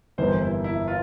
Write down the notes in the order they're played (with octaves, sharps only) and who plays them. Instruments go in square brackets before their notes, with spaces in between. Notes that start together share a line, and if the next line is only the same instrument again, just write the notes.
[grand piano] G1 F2 E3 A#3 [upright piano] C5
[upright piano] E4
E4
F4